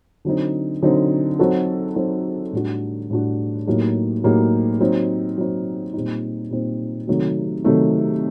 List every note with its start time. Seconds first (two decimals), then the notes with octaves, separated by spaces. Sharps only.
0.25 D3 F#3 C4 D#4
0.82 D3 F#3 C4 D#4
1.39 F#3 C4 D#4 F#4 A4
1.96 F#3 C4 D#4 F#4 A4
2.53 A2 G3 D4 F#4
3.10 A2 G3 D4 F#4
3.67 A2 F#3 A#3 D#4 G4
4.24 A2 F#3 A#3 D#4 G4
4.80 F#3 C4 D#4
5.38 F#3 C4 D#4
5.94 A#2 G3 C4 D#4
6.51 A#2 G3 C4 D#4
7.07 C3 D#3 F#3 A3 D#4
7.64 C3 D#3 F#3 A3 D#4